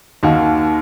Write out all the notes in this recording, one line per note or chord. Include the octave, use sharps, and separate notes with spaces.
D#2 D#3 A#3 D#4 F#4